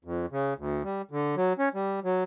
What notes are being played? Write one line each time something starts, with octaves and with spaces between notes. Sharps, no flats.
F2
C#3
D2
G3
D3
F#3
C#4
G3
F#3